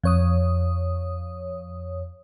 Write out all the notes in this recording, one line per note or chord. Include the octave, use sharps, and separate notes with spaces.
F2 C#5 D#6